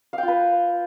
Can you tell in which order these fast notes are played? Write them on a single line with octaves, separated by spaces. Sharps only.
F5 G5 F4 B4